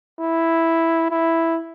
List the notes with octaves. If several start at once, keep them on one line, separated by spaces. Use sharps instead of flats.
E4
E4